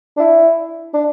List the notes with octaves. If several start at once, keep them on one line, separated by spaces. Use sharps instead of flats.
D4
E4
D4